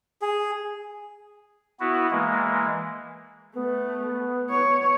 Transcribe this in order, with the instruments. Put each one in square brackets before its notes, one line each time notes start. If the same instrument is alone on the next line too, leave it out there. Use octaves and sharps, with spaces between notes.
[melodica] G#4
[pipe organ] B3 E4 F#4
E3 G#3 A#3
[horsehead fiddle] A3 [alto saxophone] B3
[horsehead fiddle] C#5